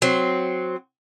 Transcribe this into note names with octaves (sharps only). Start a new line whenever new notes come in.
F#3 C4